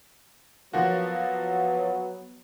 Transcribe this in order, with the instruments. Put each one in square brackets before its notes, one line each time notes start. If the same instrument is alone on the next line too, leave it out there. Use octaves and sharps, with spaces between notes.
[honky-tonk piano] F3 A#3 F#4 [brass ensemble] F#3 B3